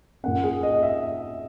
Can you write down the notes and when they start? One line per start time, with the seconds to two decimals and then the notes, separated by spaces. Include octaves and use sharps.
0.24 A#2 A#3 C#4 F#5
0.43 G#4
0.63 D#5
0.83 E5